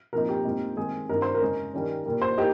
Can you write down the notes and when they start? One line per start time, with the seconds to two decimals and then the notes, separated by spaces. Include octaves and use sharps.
0.13 A#2 F3 C4 D#4 A#4
0.29 G4
0.45 A#2 G#3 C4 D#4
0.76 D#3 G#3 C4 G#4
1.09 G2 D#3 G#3 C4 D#4 A#4
1.22 C5
1.34 A#4
1.41 C#3 G#3 C#4
1.74 D#3 G3 C#4
2.06 A#2 G3 A#3
2.22 C5
2.37 A#3 D#4 G4